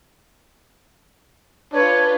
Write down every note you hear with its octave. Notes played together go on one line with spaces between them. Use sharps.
D4 F4 A4 B4 C#5